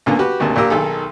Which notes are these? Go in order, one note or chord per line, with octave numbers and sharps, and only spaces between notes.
C#2 A#2 D3 A#3 B3
F#4 G4 B4
G#1 D2 C3 A#3 A5
A#1 A#2 A#3 G4 A#4 E6
B1 D#3 G#4 A4